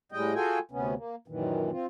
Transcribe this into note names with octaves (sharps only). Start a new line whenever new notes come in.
A2 G3 G#3 D#5 G5
F4 F#4 G#4 A4 G5 G#5
D2 C3 B3 C#4
A#3
F#2 A#2 D#3 E3
C4 F4